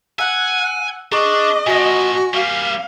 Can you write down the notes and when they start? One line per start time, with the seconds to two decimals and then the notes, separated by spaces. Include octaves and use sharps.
0.19 F#5 G#5 E6 F#6
1.12 D4 G#4 D#5 C#6 D6
1.67 A#2 F3 F#4 G#5 A#6
2.33 G3 A#3 F5